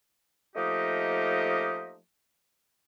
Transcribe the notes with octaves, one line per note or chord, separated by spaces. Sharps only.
F3 A3 A#3 D#4 G4 D#5